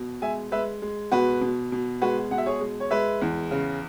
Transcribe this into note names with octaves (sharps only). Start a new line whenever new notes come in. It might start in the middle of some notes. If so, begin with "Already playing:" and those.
Already playing: B2
G#3 E5 G#5
G#3 B4 E5
G#3
B2 F#4 B4
B2
B2
G#3 F#4 B4
B2 F#5
E5
G#4 C#5
G#3
C#5
G#3 B4 E5
E2
C#3